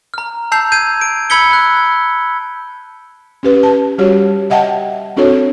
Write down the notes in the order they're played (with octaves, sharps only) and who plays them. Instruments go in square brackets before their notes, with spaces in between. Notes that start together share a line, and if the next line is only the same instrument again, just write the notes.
[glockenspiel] A#5 F6
A5 E6 G6 C7 F7
G6 G#6 C7 D#7
D7
B5 E6 G#6 B6 C#7 G7
F#6
[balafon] C#4 G4 B4
A5
G3 F#4 G4 C#5
D#5 E5 F#5 G5 A5
C4 D4 F#4 A4 C#5